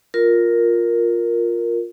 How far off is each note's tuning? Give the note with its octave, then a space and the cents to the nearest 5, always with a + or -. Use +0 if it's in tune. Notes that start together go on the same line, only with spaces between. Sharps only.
F4 +10 A#4 +0